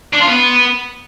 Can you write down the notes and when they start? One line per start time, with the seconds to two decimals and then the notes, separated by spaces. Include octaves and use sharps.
0.13 D4
0.20 F4
0.28 B3